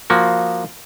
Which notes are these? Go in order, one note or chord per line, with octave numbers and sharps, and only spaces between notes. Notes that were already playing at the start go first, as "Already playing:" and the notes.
F3 A#3 F#4